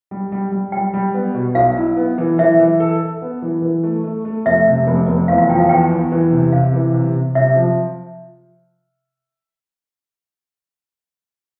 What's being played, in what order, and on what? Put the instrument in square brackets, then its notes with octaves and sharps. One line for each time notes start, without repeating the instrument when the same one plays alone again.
[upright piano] G3
G3
G3
[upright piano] G3 [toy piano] G5
[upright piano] G3
B3
B2
[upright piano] B1 [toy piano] F5
[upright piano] E4
B3
E3
[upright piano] E3 [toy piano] E5
[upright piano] E3
A4
A4
B3
E3
E3
A3
A3
A3
[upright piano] F1 [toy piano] E5
[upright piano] C3
F1
F1
[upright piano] E2 [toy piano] F5
[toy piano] F5
[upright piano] F3 [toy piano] G5
[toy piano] F5
[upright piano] E2 [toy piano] G5
[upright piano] E2
E3
C3
[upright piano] C3 [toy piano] F5
[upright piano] E3
C3
C3
[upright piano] C3 [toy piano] E5
[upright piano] F3